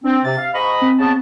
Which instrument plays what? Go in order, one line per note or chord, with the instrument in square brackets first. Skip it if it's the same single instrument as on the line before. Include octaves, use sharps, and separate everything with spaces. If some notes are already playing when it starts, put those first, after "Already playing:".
[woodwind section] C4 [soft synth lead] D4
[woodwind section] C3 [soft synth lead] A6
[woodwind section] F5
[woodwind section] G#2 D#5 B5 [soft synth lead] C#6
[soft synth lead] C4
[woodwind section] C#3 B3 A5